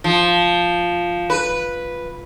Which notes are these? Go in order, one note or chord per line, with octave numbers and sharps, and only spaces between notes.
F3
B4